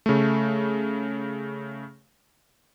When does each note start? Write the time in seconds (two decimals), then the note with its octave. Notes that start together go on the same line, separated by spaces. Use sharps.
0.06 C#3 A3